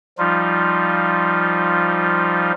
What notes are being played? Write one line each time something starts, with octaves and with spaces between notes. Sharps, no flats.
F3 G3 D#4 F4